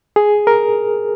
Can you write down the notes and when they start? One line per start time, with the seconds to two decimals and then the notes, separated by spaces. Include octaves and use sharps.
0.16 G#4
0.47 A#4